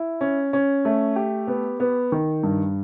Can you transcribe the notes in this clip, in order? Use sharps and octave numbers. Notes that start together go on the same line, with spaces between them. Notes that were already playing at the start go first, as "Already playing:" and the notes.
Already playing: E4
C#4
C#4
A3
G4
B3
B3
D#3
G2